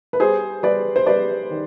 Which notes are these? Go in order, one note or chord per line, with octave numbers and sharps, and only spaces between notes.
B4
G3 G#4 C5
G3 B4 D5
C5
G3 B4 D5
D#3